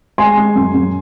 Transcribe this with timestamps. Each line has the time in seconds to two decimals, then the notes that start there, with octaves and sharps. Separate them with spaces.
0.18 G#3 G#5 C6
0.37 G#3
0.56 F#2
0.74 F#2